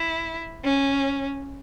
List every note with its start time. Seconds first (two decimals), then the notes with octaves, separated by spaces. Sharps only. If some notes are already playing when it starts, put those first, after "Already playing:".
Already playing: E4
0.64 C#4